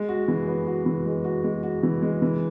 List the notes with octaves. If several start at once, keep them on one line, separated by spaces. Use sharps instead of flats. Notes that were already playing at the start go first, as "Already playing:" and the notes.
Already playing: G#3
F#4
E3
B3
F#4
E3
G#3
F#4
G#3
F#4
E3
G#3
E3